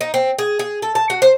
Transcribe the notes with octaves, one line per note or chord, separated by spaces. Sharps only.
D#4
C4
G#4
G#4
A4
A5
F#4
C5